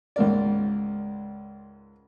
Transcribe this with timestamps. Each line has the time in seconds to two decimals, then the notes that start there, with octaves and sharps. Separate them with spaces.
0.16 C#2 G#2 A#4 D5